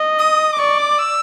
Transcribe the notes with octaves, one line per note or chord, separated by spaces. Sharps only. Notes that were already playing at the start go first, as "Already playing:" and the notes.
Already playing: D#5
D#6
D6
D5 C#6
D6
E6